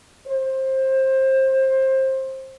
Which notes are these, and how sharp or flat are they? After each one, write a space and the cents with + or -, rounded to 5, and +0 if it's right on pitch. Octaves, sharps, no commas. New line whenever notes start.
C5 +20